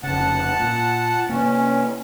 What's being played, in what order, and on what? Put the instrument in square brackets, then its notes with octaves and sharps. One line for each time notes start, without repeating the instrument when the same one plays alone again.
[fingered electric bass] F1 C#3 [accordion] F#5 A5
[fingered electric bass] A#2
[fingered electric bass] C3 A#3 [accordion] C#4